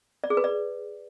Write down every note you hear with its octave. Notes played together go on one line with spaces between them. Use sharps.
D5
G#4
B4
D5